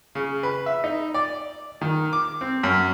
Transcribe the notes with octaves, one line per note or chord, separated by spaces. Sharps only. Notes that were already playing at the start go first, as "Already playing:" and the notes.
C#3
B4
E5
D#4
D5
D#3
D6
C4
F#2